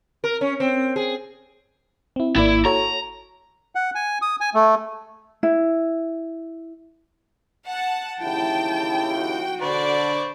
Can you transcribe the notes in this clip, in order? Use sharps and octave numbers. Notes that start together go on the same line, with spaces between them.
A#4
C#4
C4
G#4
C4 E4
G#1 A#3 E4 D5
F#4 A4 C#5 A#5
F#5
G#5
D#6
G#5
A3
E4
F#5 A5
D#2 C#3 E4 G5 A5
F#4
D3 C5 D5 B5 C#6